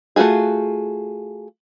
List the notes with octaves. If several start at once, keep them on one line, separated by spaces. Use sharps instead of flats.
A3 C4 F4 F#4 G#4